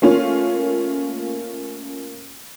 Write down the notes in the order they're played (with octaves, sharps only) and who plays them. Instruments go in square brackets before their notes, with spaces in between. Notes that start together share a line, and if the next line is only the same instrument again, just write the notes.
[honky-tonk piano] A3 A#3 C#4 F4 C#5